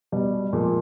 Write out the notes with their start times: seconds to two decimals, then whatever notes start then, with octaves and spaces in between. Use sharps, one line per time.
0.12 B2 G3
0.53 A#2 F3 G#3